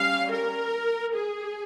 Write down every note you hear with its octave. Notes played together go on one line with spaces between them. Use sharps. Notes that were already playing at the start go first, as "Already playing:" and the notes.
Already playing: G3 C#4 F5
A#4
G#4